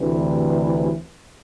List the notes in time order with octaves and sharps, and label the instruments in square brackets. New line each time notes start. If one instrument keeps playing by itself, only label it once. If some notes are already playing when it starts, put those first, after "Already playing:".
Already playing: [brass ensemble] D2 C3 E3